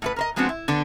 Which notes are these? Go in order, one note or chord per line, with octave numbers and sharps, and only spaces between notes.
A2 F4 B4
A#4 C5 D#5
F3 G#3 B3 C4 D4 F#4
E4
D3 B3 D4